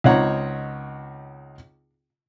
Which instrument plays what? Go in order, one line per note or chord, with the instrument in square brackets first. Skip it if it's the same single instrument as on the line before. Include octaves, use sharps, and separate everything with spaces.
[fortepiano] C#2 C4 D#4 C#5 F#5 A#5